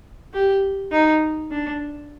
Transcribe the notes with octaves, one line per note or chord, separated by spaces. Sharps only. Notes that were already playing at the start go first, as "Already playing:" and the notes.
G4
D#4
D4